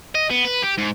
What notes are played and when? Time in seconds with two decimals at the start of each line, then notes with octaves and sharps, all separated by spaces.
0.15 D#5
0.30 B3
0.45 B4
0.63 G4
0.78 G#2